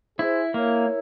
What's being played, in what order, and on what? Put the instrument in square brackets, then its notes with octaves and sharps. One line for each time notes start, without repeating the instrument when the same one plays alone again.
[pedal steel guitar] E4 [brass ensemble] G#4 C5
[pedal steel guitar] A#3 [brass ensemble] A#4 C#5